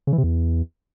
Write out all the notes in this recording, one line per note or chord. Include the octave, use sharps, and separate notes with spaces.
C#3
E3
C3
E2